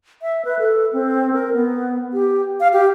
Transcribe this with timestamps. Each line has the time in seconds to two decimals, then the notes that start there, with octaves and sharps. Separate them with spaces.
0.22 E5
0.45 B4
0.59 A4
0.93 C4
1.33 A#4
1.54 B3
2.13 G4
2.60 F5
2.73 G4